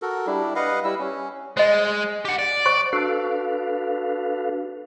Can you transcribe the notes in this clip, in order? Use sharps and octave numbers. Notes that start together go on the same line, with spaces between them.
F#4 A4 A#4
G3 D4 E4
B4 D#5 F5 F#5
G3 E4 E6
C#4
G#3 C5 D#5
G4 F#5
D5
C5 C#6
D4 F#4 A4 B4 F5